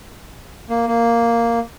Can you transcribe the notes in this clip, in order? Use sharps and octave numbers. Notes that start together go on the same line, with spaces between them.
A#3
A#3